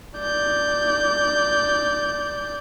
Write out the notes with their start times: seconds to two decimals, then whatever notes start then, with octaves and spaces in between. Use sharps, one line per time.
0.19 D5 G6